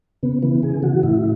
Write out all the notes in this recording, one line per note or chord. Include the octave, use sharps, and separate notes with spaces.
C#3 B3
E3 B3
C#3 G#4
E3 F#4
A2 E4